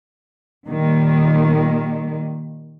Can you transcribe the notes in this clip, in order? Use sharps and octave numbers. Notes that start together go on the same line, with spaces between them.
A#2 D#3 G3 A#3